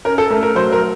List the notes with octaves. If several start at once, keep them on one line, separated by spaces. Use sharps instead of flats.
C#4 A#4
A4
A3 A#4
A#4
F#3 C5
A#4